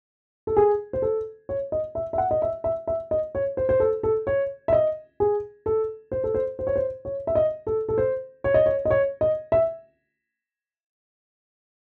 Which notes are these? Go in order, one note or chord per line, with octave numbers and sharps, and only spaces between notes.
A4
G#4
C5
A4
C#5
D#5
E5
E5
F#5
D#5
E5
E5
E5
D#5
C#5
C5
C5
A4
A4
C#5
E5
D#5
G#4
A4
C5
A4
C5
C5
C#5
C5
C#5
E5
D#5
A4
A4
C5
C#5
D#5
C#5
D#5
C#5
D#5
E5